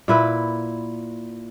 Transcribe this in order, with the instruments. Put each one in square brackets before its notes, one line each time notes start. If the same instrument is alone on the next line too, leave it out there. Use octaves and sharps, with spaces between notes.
[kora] A#2 E4 B4